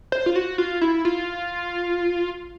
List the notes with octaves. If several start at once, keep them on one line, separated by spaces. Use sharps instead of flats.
C5
F4
F#4
F4
E4
F4